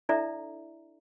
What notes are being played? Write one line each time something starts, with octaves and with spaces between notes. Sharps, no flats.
D4 E4 A4 D5 E5 A#5